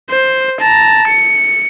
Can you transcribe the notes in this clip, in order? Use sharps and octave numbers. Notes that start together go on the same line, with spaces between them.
C5
A5 A#5
C#7